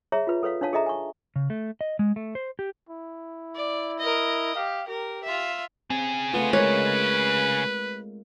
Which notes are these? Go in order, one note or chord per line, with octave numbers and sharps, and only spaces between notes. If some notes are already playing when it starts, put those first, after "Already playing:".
G#4 C#5 E5 A#5
F4 B4
A4 B4 C#5 F5
D4 D#4 C#5 F5 A5
G#4 A4 D#5 E5 A#5
G#5 C#6
C#3
A3
D#5
G#3
A3
C5
G4
E4
D5
A#4 D#5
G4 F5
G4 A#4
F4 E5
C#3 C4 G#4
A3 B3 F4
G#3 A#4 B4 C#5